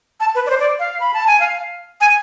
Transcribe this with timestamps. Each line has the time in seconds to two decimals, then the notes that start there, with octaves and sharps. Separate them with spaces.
0.20 A5
0.35 B4
0.46 D5
0.50 C5
0.60 D5
0.79 F5
1.00 B5
1.14 A5
1.27 G#5
1.40 F5
2.01 G#5